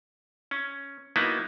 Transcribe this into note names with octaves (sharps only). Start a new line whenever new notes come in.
C#4
F#3 A#3 B3 D#4 E4